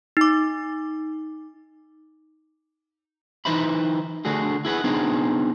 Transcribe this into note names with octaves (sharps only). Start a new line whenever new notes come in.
D#4 D6
E3 D#4 B4 C5 E5 B5
D3 A3 D4 F#4 G#4
E4 G#4 B4 F#5
B3 D4 D#4 G#4 C5